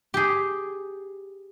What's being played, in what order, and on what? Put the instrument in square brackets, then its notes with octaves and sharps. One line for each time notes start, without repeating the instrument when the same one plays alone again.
[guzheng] G4 G#4